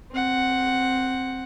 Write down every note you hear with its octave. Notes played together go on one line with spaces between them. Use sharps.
C4 F#5